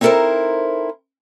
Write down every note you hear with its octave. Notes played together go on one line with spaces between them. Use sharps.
C4 D#4 E4 A4 A#4 C5